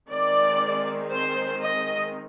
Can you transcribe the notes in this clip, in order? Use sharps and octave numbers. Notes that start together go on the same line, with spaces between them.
D#3 G#3 C4 D5
C5
D#5